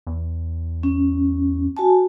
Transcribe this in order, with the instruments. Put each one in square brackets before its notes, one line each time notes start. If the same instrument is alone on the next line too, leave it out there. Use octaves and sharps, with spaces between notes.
[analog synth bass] E2
[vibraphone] C#4
F#4 G#5 A5